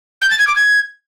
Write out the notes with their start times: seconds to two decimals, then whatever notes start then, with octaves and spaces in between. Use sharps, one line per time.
0.21 G6
0.30 A6
0.38 G#6
0.47 D6
0.56 G#6